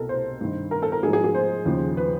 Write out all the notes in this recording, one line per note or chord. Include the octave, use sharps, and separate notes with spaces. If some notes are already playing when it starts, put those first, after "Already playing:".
Already playing: C2 B2 A4 A#4
C5
G2 D#3
A#4
A4
A#4
G#2 F3 G#4
G#4
G#4
C5
D#2 C#3 F3
B4